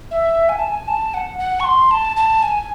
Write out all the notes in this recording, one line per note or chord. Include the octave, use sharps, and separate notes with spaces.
E5
G#5
A5
G#5
A5
F#5
F#5
C#6
C6
A5
A5
G#5